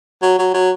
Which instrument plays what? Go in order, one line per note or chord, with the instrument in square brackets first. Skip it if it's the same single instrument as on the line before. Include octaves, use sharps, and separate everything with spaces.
[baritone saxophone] F#3
F#3
F#3